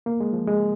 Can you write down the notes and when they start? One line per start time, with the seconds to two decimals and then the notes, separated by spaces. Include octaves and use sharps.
0.06 A#3
0.20 G#3
0.33 F3
0.47 G#3